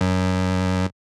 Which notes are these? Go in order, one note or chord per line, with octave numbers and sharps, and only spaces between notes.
F#2